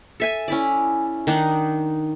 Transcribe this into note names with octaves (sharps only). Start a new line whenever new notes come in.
A4 E5 G#5
C#4 E4 D5
D#3 D4 D#4 F#5